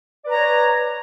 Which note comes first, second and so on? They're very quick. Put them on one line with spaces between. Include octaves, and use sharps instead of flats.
D5 B4 A#5 C#5